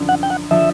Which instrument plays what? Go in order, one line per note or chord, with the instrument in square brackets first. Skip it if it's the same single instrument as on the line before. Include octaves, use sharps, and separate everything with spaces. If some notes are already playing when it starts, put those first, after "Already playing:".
Already playing: [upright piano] F#2 D3 F3
[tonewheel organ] F#5
G5
F#5
[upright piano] D3 F3 [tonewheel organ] E5